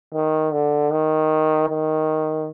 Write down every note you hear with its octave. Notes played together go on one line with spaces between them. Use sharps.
D#3
D3
D#3
D#3